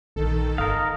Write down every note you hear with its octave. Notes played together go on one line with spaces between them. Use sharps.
A#1 D#3 A4
G1 A#4 D#5 F5